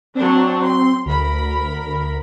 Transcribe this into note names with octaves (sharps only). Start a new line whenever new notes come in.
F#3 C4 D4
C6
D2 A#4 B5